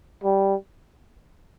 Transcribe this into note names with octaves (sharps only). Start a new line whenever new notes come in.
G3